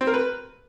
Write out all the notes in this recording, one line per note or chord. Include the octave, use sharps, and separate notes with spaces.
C4
A#4
B4